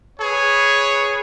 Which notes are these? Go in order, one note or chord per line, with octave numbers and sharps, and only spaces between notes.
G#4 B4 C#5